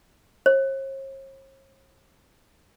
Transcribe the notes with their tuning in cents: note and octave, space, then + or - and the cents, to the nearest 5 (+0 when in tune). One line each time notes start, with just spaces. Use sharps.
C#5 -45